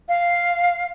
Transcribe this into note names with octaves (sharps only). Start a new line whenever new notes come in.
F5